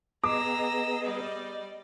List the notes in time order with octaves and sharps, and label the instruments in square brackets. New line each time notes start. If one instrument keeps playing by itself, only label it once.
[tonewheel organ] B3 G#4 [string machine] D#5 [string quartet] A#5 E6 A#6 [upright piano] D6
[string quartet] G3 D5